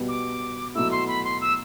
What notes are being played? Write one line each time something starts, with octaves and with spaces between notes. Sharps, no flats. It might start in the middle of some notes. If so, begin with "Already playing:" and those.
Already playing: B2 G3 B3
D6
B2 F#3 A3 E4 E6
C6
B5
C6
E6